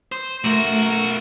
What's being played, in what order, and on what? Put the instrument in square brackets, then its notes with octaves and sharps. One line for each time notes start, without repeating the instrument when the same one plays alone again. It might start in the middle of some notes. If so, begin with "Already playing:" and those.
[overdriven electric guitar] C5
[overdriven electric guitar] B1 A#4 [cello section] A3 [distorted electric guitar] F#4